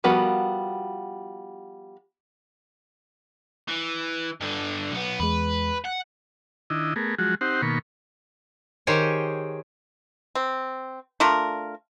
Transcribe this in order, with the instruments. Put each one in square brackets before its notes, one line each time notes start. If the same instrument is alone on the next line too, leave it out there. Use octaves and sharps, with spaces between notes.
[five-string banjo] F3 G3 B3 F#4 A#4
[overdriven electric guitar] E3
G2 D3
B1 B3
[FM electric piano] E2 G#3 [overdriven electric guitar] B4
[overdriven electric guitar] F#5
[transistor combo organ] D#3 D4 E4 D#5
A3 B3 G#4 A#4
F3 F#3 G#3 F#4
C4 D#4 G4 C5 F#5
B2 D#3 A#3 B5 C#6
[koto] D#3 G4 G#4 C5 C#5
[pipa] C4
A3 D4 F4 A#4